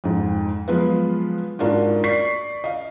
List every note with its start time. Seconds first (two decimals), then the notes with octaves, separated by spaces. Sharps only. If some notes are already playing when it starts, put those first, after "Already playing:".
0.04 F2 G#2
0.68 F3 F#3 G#3 B3 F4 B4
1.59 G#2 A#3 D4 F4 F#4
2.04 D5 C#6 B6 C7
2.64 D#5 F5